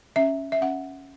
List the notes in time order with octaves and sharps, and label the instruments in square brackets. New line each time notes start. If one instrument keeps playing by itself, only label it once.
[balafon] C#4 E5
E5
C#4 F#5